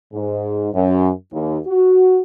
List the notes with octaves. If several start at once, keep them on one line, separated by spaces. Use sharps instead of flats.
G#2
F#2
D#2
F#4